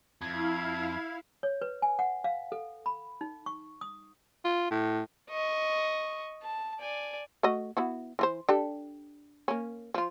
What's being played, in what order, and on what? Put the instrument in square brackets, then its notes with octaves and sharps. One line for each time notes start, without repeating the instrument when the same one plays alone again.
[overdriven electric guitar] F2 [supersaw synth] E4 F5 [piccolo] G#6
[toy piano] C#5
B4
G#5
F#5
F5
A4
B5
D#4
C#6
D#6
[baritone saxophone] F4
A2
[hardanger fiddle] D#5 C#6
A5
D5 G#5
[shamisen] A3 F#4 D#5
B3 E4 F#4
E3 F4 C5
D4 G4 A4
A#3 C#4
F3 F4